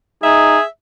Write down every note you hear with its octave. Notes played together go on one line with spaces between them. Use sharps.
D#4 G#4 E5